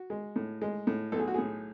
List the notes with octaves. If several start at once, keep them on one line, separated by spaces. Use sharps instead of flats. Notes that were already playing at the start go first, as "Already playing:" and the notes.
Already playing: F#4
G#3
A2
G#3
A2
B1 A4
G#4
F#4
A2 G#4